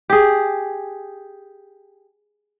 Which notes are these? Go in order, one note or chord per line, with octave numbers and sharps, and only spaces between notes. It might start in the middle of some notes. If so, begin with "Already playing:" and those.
G4 G#4